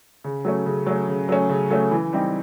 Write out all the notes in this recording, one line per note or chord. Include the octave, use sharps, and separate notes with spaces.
C#3
F#3 A3 C#4
C#3
F#3 A3 C#4
C#3
F#3 A3 C#4
C#3
F#3 A3 C#4
E3
G3 C4 D#4